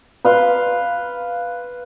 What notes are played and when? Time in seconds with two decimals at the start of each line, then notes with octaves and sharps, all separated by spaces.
0.25 B4 F5 C6